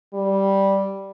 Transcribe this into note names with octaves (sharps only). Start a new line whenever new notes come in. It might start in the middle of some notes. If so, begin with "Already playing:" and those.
G3